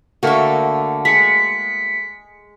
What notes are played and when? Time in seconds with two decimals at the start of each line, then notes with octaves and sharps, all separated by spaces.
0.23 D3 A3 A#3 F#4 E5
1.05 G#3 B6 C#7